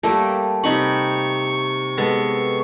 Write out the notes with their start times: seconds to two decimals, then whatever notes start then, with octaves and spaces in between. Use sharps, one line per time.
0.03 G3 A3 A#3
0.64 C3 D#4 B5 C#6
1.97 G#3 B3 A4